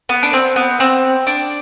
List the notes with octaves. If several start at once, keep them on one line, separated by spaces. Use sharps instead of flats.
B3
D4
C4
B3
C4
D4